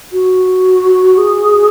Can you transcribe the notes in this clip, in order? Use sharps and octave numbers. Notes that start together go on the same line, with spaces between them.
F#4
G#4